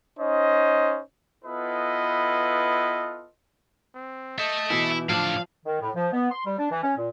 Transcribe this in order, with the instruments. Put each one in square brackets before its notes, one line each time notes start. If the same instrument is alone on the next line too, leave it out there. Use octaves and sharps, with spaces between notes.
[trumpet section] C#4 D#4 C5 D#5
B3 E4 F4 A4 B4 D#5
[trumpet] C4
[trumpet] D#5 [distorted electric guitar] E5 A5 [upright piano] G6
[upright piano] B2 E3 [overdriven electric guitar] E4
[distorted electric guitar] A2 D4 [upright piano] F3 [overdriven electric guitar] F5 [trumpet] A5
[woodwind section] D#3
A2
F3
B3
C6
G3
D4
E3
C#4
A#2